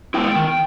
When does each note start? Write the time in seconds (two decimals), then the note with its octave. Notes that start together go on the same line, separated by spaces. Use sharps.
0.14 G#3 B3 E4 G5
0.35 D#3